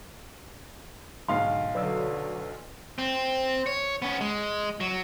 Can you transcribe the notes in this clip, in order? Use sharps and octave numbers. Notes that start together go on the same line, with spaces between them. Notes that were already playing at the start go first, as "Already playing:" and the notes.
B1 G#2 D3 F5 C6
D3 F#3 B4 D5 E6
C4
C#5
B3 C#4
G#3
F#3